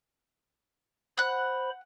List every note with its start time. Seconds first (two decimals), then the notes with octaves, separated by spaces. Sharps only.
1.18 C5 F#5 B5 F#6